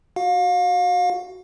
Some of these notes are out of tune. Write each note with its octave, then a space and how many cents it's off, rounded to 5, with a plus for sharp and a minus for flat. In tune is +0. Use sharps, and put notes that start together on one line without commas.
F#4 +0 F5 +35